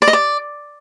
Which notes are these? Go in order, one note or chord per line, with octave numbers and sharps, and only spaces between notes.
D5
D#5
D5